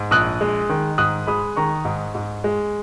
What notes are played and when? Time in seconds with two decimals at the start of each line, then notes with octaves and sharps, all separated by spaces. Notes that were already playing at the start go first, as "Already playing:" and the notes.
Already playing: G#2
0.11 A#1 D#6 F#6
0.41 G#3
0.69 D#3
0.98 G#2 D#6 F#6
1.27 G#3 B5 D#6
1.56 D#3 A#5 C#6
1.85 G#2
2.15 G#2
2.44 G#3